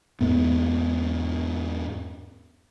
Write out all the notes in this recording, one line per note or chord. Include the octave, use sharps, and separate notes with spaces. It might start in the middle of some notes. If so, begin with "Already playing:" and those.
E2 G#2 B3